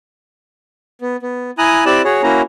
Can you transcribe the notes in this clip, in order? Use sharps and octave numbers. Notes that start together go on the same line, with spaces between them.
B3
B3
E4 G#5 A#5 D#6 F#6
C4 E4 G4 D5 E6 F#6
F#4 G#4 C#5
A#3 C#4 E4 F#4 A#5